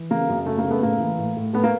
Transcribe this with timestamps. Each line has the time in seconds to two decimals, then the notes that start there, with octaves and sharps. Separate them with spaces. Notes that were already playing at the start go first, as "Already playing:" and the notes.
Already playing: E3
0.11 C#3 A#3
0.29 F#2
0.46 C#3 A3
0.58 A#3
0.64 C#3
0.71 A3 B3
0.83 A2 A#3
1.00 E3
1.18 A2
1.36 A2
1.53 A2 A3 B3
1.64 A#3